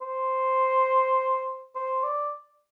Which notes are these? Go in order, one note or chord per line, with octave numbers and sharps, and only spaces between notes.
C5
C5
D5